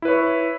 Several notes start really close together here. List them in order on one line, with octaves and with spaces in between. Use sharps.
E4 B4 C#5